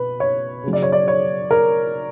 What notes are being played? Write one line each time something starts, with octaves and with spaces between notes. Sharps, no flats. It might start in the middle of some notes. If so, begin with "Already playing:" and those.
Already playing: B2 B4
C#5
C#3 F#3
D5
C#5
D5
C#5
A#4